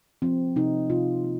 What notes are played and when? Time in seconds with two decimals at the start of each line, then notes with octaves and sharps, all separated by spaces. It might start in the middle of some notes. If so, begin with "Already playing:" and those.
0.22 F3 C4
0.56 C3 D#4
0.90 C3 F4
1.24 A#3